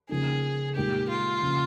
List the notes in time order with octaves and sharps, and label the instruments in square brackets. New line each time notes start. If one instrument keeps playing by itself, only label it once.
[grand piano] C#3 F3 A#3 D#4 [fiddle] G#4
[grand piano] A#2 G#3 D#4 A#4 [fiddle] G4
[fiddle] F4
[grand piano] C#3 F3 A#3